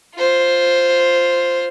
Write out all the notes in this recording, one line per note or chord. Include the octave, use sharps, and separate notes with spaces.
F4 C5